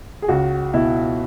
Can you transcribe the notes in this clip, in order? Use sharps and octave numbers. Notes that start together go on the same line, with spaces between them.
G#4
C#2 F#4
B2 E4